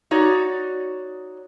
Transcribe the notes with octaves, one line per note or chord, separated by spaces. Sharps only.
D#4 F#4 C#5 D5